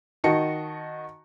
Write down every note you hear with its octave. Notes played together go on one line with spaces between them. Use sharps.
D#3 F#4 D#5 A5 C#7